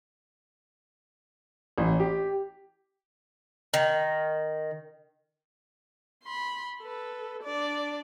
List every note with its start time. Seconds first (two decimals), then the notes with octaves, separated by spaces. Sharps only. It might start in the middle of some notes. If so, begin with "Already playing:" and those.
1.78 A1
2.00 G4
3.74 D#3
6.23 B5 C6
6.81 A4 B4
7.43 D4 D5